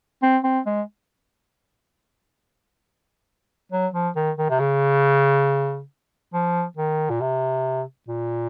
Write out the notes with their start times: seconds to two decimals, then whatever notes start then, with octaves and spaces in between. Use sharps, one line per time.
0.23 C4
0.44 C4
0.66 G#3
3.72 F#3
3.94 F3
4.16 D#3
4.37 D#3
4.50 C3
4.60 C#3
6.33 F3
6.77 D#3
7.10 A#2
7.21 C3
8.08 A#2